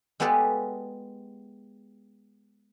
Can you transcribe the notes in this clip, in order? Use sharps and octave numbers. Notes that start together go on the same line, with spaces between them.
G#3 B3 G4 A4 B4 D5